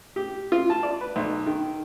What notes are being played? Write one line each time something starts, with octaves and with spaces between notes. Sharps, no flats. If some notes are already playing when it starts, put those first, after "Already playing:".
G4
F4
A5
D5
B4
B1
D#3